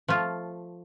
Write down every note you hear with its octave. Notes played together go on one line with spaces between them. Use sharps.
F3 A3 F4